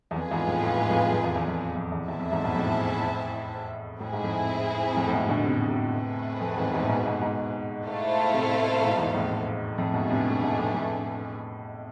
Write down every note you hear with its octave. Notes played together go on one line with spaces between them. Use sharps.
E2
F2 F4 G#4 B4
E2 G#2
F2 A2
A2
G#2
F2 A2
F2
E2
E2
F2
F2
E2
E2 E4 G#4 C5 E5 A5
F2
E2 G#2
G#2 B2
F2 A2
A2 C4 E4 G#4
G#2
F2 A2
F2 A2
A2
G#2 B2
B2 D3
C3
B2
A2 C3
A3 C4 G#4 B4
F2
E2 G#2
E2 G#2
A2
G#2 B2
G#2 B2
G#2 B2
A3 E4 A4 C5 F5
A2 C3
G#2 B2
E2 G#2
F2 A2
F2 A2 A3 D4 G#4 B4
G#2 B2
A2 C3
A2
G#2 B2
F2 A2
F2 A2